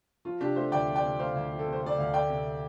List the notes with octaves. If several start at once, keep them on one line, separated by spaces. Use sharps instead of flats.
F3 F4
C3 D4 G4
A3 G4 C5
D2 D5 G5
F3
D5 G5
C3
A3 C5 F5
D2
F3
A4
C3
C5
A3 D5
D2 F5
A3 D5 G5
C3